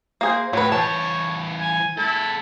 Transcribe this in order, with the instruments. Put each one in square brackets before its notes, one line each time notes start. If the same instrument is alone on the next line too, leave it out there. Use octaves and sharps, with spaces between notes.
[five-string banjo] A#3 G#4 C5
[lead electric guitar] A2 [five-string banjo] F#3 B4 [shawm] C#5
[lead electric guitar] E3 C5 [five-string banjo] A5
[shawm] G#5
[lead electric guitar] G#3 A4 [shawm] E4